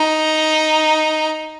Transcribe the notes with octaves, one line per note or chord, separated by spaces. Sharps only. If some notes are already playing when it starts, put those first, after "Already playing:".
Already playing: D#4